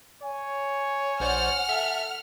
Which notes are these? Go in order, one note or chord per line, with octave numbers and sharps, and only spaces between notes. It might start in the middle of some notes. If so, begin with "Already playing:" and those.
C#5 G#5
A#1 C5 D5 F#5 F6
A4 E5